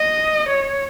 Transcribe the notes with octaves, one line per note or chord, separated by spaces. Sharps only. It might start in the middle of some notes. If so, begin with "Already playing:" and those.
Already playing: D#5
C#5